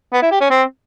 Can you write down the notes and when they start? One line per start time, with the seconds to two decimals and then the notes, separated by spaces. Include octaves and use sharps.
0.13 B3
0.22 E4
0.31 G4
0.41 C#4
0.50 C4